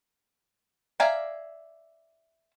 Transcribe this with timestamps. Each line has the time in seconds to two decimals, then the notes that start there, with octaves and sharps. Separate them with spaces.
1.00 D5 E5 F5 G#5 A#5